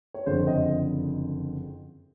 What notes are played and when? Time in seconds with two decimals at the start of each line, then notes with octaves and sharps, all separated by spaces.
0.14 C#5
0.26 F#1 F2 D3 C5
0.47 D#5